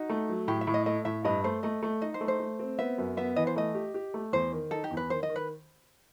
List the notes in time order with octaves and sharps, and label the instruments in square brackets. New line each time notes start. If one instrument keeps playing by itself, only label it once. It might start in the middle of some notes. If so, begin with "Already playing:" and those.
Already playing: [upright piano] D#4 [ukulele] F#4
[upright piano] A3
F#3
[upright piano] A2 [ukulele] G4
[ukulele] E5
[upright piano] A2
[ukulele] D#5
[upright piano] A3 [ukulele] D#5
[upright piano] A2 [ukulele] E5
[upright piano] G2 [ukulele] D#5
[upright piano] A3 [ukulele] C5
[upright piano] A3 [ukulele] D#5
[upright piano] A3
[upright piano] D#4 [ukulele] D#5
[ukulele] C5
[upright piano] A3
[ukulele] C5
[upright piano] A3
C4
[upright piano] B3 [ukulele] E5
[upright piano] F#2
[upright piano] B3 [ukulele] E5
[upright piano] E3 [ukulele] D#5
[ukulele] C5
[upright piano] A3 [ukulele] D#5
[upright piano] G4
G4
A3
[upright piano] E2 [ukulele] C5
[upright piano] D#3
[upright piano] D#4 [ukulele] A4
[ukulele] G4
[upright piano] E2
[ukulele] B4
[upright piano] D#3 [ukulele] C5
[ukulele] D#5
[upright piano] D#3
[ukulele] B4